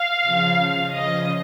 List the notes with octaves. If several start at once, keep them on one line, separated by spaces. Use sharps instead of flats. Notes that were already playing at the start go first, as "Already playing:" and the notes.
Already playing: F5
C#3 F3
C#3 F3 D#5